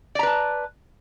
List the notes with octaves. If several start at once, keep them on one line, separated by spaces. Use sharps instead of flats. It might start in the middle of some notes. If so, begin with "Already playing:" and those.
B4 D5 A5 A#5